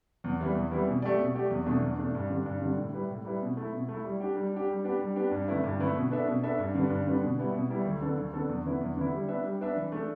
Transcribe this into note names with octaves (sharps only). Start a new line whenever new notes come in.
E2
E3 G3 B3 E4
E2
E3 G3 B3 E4
B2
A3 G4 D5
B2
A3 G4 D5
E2
B2 A3 D4
E2
B2 A3 D4
G2
D3 G3 D4
G2
D3 G3 D4
A2
G3 E4 B4
A2
G3 E4 B4
B2
A3 E4
B2
A3
E4
G3
D4 G4
G3
D4 G4
G3
B3 D4 G4
G3
B3 D4 G4
G2
D3 A3 E4 B4
G2
D3 A3 E4 B4
B2
B3 D4 A4 E5
B2
B3 D4 A4 E5
G2
D3 G3 D4 B4
G2
D3 G3 D4 B4
B2
G3 B3 E4
B2
G3 B3 E4
D2
D3 B3 D4 A4
D2
D3 B3 D4 A4
E2
D3 B3 E4
E2
D3 B3 E4
G3
B3 D4 B4 E5
G3
B3 D4 B4 E5
E3
A3 D4 A4